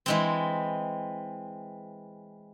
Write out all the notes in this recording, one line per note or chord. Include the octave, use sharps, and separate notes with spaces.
E3 G#3 C4